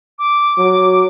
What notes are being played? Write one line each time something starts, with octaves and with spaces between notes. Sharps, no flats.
D6
F#3